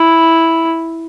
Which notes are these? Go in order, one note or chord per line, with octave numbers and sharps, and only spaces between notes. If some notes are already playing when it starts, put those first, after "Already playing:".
Already playing: E4